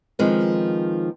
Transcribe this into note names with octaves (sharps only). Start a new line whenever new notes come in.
D#3 F3 G#3 B3 C4